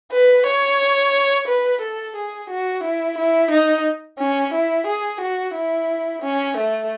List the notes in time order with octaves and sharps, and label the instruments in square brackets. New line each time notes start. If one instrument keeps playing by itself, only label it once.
[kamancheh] B4
C#5
B4
A4
G#4
F#4
E4
E4
D#4
C#4
E4
G#4
F#4
E4
C#4
A3